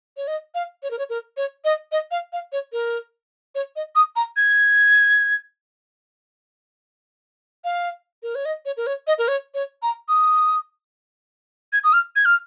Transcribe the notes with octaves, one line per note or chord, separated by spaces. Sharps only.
C#5
D#5
F5
C#5
A#4
C#5
A#4
C#5
D#5
D#5
F5
F5
C#5
A#4
C#5
D#5
D#6
A#5
G#6
F5
A#4
C#5
D#5
C#5
A#4
C#5
D#5
A#4
C#5
C#5
A#5
D#6
G#6
D#6
F6
G#6
F6